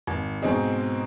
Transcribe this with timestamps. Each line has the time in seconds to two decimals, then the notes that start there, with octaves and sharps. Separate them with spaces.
0.07 G#1
0.42 G#2 B2 C4 D#4 G#4